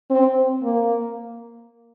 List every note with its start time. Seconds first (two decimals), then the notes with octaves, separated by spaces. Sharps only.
0.10 C4
0.63 A#3